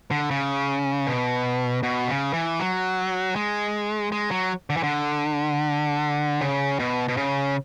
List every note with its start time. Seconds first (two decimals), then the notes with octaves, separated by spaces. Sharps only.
0.11 D3
0.31 C#3
1.07 B2
1.83 B2
2.08 C#3
2.33 E3
2.60 F#3
3.36 G#3
4.12 G#3
4.31 F#3
4.70 D3
4.77 E3
4.83 D3
6.41 C#3
6.79 B2
7.08 B2
7.17 C#3